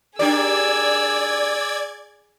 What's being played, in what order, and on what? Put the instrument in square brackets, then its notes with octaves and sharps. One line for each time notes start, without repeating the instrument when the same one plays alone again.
[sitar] D4 G4 A#4 [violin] G#4 E6 [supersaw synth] D5 G#6